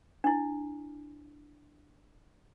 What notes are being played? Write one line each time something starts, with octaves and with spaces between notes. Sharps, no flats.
D4 E4